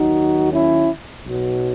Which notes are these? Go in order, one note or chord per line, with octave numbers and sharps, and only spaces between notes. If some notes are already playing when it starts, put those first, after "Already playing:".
Already playing: D#2 D#3 F#3 D#4 F#4
C#4 E4
B1 B2 F#3